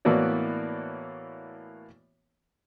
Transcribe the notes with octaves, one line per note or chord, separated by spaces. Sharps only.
A2 E3 A#3 B3 F#4 D5